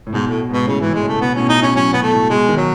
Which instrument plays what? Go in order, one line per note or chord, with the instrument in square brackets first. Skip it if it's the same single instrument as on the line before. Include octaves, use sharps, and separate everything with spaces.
[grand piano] A2
[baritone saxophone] G#2 [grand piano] B2
[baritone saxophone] A2
[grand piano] G#2 [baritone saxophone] B2
[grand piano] A2 [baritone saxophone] C#3
[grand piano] A2 [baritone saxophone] E3
[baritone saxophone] G#3
[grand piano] C#3
[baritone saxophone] A3
[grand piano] B2 [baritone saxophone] B3
[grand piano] A2 [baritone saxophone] C#4
[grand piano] B2
[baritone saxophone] D#4
C#4
[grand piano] F#3 [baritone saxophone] C#4
[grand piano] B2 [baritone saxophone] B3
[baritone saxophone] A3
[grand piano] A2
[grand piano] B2 [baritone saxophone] G#3
[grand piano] D#3
[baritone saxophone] F#3